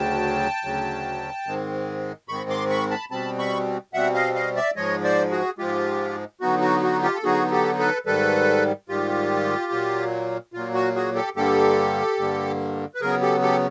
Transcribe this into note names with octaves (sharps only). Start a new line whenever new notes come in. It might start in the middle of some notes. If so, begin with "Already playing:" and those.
Already playing: D2 C#3 F#3 G5 A5
D2 C#3 F#3
G#2 D#3 G#3 C4
G#2 D#3 G#3 C4 B5 C#6
C6 D6
B5 C#6
A5 B5
B2 G3 C4 A5 B5
B5 C#6
B2 G3 C4 E5 F#5
D#5 F5
D#5 F5
D5 E5
G#2 F3 G#3 C#5 D#5
C5 D5
F#4 G#4
G#2 F3 G#3 F4 G4
D3 F#3 B3 D#4 F#4
F#4
F#4
F4 G4
A4
D3 F#3 B3 D#4 F#4 G#4
G4 A4
A4 B4
G#2 D#3 G3 A4 B4
G#2 D#3 G3 F4 G4
A#2 F#3 A#3
A#2 F#3 A#3 F4
F#4
F#4 G#4
G4 A4
G2 D3 G3 A#3 G4 A4
G2 D3 G3 A#3
B4
C#3 F#3 B3 G#4 A#4
G4 A4
G4 A4